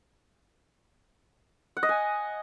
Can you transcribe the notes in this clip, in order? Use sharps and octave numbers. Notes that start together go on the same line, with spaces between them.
F#5
D#5
G#5